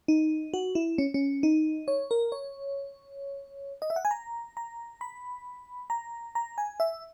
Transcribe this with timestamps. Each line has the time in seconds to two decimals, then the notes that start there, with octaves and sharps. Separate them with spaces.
0.08 D#4
0.54 F#4
0.75 E4
0.98 C#4
1.14 C#4
1.43 D#4
1.88 C#5
2.11 A#4
2.32 C#5
3.82 D#5
3.90 E5
3.96 F#5
4.05 G#5
4.11 A#5
4.57 A#5
5.01 B5
5.90 A#5
6.35 A#5
6.58 G#5
6.80 E5